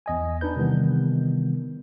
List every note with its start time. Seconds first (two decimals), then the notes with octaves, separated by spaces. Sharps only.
0.06 E2 D#5 G#5
0.41 D4 D#4 B4 G6
0.56 C3 D#3 E3 G3 B3